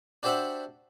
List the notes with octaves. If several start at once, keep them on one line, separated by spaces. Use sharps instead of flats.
D4 F#4 G4 C5 E5 F#5